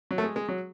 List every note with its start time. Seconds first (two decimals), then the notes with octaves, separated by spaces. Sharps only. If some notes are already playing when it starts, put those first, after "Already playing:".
0.11 F#3
0.18 A3
0.24 G#3
0.36 G#3
0.49 F#3